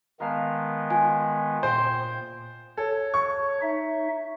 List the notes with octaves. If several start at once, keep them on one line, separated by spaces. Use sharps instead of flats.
D#3 G#3 B3 A#4 F5 A5
F4 G#5
A#2 C5 G5
A4 C#5
C#6
D#4 E5